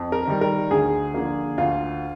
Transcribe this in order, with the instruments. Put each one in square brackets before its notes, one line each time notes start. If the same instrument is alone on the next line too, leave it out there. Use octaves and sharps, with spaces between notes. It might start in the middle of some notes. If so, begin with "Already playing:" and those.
Already playing: [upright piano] F2
A#4
D#3 G3
A#4
D2 G#4
D3 F3 A#3
D2 F4